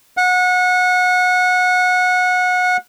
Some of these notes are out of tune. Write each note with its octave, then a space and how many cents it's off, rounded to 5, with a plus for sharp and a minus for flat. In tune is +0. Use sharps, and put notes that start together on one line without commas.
F#5 -25